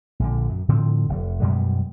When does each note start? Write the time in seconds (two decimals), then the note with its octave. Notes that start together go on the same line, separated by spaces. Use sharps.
0.20 A#1 D3
0.49 F#2
0.69 A2 D3 F3 C4
1.09 F1
1.41 F#2 B2 G3 G#3